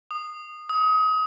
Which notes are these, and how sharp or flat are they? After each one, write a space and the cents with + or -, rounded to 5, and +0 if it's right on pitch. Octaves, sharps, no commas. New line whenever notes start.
D#6 -20
D#6 +30